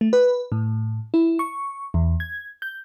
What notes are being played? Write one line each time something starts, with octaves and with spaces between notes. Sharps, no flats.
A3
B4
A2
E4
C#6
E2
G#6
G6